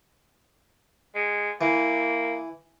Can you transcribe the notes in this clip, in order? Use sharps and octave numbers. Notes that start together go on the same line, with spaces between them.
G#3
E3 A#3